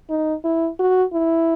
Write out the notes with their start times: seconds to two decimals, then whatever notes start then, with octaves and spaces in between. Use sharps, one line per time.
0.10 D#4
0.44 E4
0.79 F#4
1.13 E4